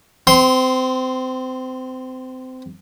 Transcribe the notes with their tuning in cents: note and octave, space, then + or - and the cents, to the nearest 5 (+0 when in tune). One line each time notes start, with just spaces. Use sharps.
C4 -25 C6 +0